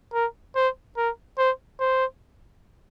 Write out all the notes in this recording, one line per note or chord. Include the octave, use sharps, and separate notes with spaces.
A#4
C5
A#4
C5
C5